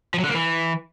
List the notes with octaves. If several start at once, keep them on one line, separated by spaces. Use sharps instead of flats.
F3
F#3
D3
A#3
E3